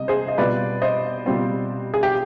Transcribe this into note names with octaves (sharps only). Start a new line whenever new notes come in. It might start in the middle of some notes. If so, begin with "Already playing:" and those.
Already playing: C3 G3 B3 D#5
G#4 C5
D#5
B2 G3 C4 F4 B4 D5
C5 D#5
B2 G3 C4 F4
G#4
G4